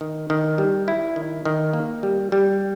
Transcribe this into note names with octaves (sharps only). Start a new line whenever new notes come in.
D#3
D#3
G3
E4
D#3
D#3
A#3
G3
G3